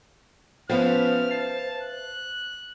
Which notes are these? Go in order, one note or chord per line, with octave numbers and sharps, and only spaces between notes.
F3 B3 C#4 B4 C5 E5 F5 F6
A5 C7
F#6